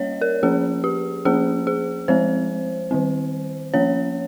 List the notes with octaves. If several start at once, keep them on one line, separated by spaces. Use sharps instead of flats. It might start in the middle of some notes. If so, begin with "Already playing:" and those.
Already playing: G3 A#3 C#4 C#5 D#5
A#4
F3 A#3 C#4 G#4
G4
F3 A#3 C#4 G#4
G#4
F3 G#3 C4 C5
D#3 G3 C4
F3 A#3 C#4 C#5